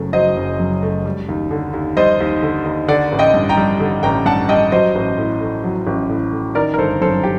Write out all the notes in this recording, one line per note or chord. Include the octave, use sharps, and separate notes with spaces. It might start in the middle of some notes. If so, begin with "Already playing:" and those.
Already playing: F#1 F#2 A3
F#3 C5 D#5
F#1
F#2
A3
G3
D#2
D3
D#2
G3 C5 D#5
D#2
D3
D#2
D3 D5 F#5
A1
D#5 G5
G2
G5 A#5
G3
D3
A1 G5 A#5
G2 F#5 A5
G3 D#5 G5
F#3 C5 D#5
A1
A2
A3
F#3
A1
A2
A3
D#3 A#4 D5
A#4
G1 A4 C5
F#2 A4 C5
G4